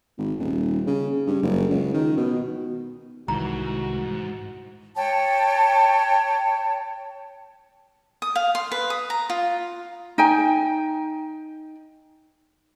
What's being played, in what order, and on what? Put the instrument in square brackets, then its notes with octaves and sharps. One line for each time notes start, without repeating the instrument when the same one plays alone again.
[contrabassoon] G#1
D#1
C#3
G2
F#1
C#2
D#3
B2
[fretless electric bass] C2 D#3 E3 [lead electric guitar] G#2 [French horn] F#4 [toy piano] A#5
[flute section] C#5 G5 A5
[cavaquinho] D#6
F5
C6
B4
D#6
A#5
F4
[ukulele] D#4 G5 G#5